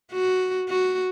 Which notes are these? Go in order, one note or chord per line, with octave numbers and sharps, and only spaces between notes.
F#4
F#4